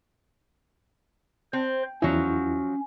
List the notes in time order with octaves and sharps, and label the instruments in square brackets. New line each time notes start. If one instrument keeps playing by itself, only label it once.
[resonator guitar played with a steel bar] C4 [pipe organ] C5
[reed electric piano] E2 E4 [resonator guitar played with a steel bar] F3 F#3 [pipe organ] C#4